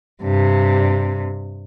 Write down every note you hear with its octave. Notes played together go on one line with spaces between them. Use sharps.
G2 C3